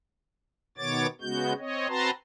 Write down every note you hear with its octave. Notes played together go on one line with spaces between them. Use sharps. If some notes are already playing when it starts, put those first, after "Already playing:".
B2 D#3 B3 C#5 D6 A6
C#3 G#3 B3 F#4 G6
C4 C#5 D#5
C4 F#4 B4 A5 A#5 C6